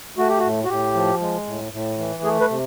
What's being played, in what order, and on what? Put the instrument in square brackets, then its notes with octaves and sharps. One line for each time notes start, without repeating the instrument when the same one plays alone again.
[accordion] A3 F#4
G4
F#4
A2
F#4
A2 G4
F3
G#3
A2
A2
E3
A3 G#4
B4
C3